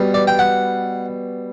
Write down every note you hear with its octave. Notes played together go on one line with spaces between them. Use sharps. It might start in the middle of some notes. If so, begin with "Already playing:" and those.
Already playing: B2 G3
D5
G5
F#5